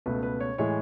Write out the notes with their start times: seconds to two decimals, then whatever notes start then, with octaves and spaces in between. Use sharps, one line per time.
0.06 C#2 B2 A3 B4
0.23 B4
0.40 C#5
0.58 A2 E3 G#3 C#5